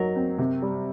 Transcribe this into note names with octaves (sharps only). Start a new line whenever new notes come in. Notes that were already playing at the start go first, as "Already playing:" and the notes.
Already playing: F#3 D#4 A#4
C4
C3
G3